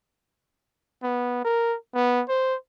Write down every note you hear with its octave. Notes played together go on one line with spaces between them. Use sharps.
B3
A#4
B3
C5